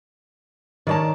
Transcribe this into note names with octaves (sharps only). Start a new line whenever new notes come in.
D#3 A#4 C#5 D5 A5 A#5